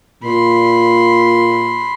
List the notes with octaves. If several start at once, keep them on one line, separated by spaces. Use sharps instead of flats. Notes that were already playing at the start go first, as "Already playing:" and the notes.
A#2 B5 C6